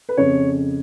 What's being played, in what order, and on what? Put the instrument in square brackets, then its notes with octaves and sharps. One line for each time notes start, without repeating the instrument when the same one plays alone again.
[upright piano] B4
F2 C#3 C#5